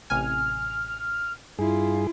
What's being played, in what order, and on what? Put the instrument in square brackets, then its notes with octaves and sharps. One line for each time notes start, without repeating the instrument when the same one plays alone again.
[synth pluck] A1 C3 G#5 [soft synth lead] F6
[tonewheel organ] G2 G#4 [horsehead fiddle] E4 F4